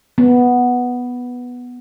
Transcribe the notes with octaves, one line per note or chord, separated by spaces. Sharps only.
B3